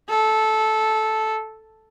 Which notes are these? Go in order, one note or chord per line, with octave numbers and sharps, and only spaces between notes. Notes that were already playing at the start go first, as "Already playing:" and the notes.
A4